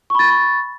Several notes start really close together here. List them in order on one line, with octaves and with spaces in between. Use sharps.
C#6 B5 A6